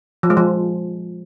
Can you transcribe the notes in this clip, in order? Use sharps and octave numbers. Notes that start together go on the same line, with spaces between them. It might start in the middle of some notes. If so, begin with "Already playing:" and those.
F3
G#3
F3